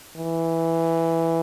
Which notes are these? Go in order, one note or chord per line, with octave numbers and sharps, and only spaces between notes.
E3